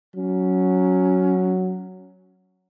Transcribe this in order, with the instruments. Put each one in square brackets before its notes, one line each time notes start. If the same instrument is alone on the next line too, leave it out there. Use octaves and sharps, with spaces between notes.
[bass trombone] F#3 [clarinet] C#4